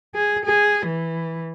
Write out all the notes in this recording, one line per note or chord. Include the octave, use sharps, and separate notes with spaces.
G#4
G#4
E3